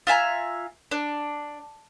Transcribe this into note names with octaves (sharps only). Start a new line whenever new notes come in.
F4 E5 G#5 A#5
D4